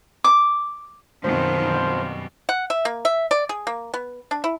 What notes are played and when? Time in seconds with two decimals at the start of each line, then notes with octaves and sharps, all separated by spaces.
0.24 D6
1.24 F#2 B2 D#3 F3 G3 C4 C5
2.49 F#5
2.70 E5
2.85 A#3
3.05 E5
3.31 D5
3.49 G#4
3.67 A#3
3.94 B3
4.31 D4
4.44 E4